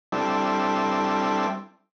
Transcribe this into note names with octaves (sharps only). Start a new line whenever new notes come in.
G3 C4 D4 E4 A4